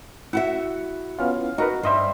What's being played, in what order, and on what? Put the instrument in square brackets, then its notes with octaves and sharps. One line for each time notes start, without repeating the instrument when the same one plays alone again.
[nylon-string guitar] E4 F#4 E5 [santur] F#5
[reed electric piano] B3 C#4 F4 [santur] F5
[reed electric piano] D#4 A#4 B4 [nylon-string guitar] F#4
[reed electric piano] G2 D#5 E5 [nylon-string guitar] G3 [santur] C4 B5 C6